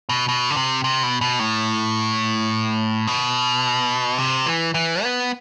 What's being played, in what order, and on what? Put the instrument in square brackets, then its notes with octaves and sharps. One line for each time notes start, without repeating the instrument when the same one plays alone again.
[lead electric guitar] B2
B2
D3
C3
C3
B2
B2
A2
B2
C3
E3
E3
B3